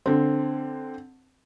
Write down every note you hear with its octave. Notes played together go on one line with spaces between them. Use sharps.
D3 C4